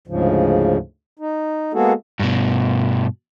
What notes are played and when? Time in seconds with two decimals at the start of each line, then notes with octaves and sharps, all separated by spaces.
0.08 D2 G#2 C#3 F3
1.19 D#4
1.74 G#3 A#3 B3 F#4 G#4 A4
2.20 G2 B2